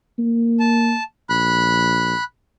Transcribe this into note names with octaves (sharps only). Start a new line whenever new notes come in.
A#3
A5
A#1 B5 F#6